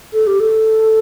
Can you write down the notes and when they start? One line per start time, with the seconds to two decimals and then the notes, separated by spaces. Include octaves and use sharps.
0.13 A4
0.27 G4
0.40 A4